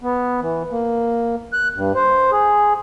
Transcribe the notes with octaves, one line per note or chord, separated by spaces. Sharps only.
B3
E3
A#3
F#6
G2
C5
G#4